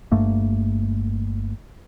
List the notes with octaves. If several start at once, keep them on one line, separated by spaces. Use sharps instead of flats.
G1 G2 A3 A#3